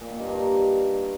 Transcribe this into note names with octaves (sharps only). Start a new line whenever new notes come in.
A#2
D#3
G2
D#3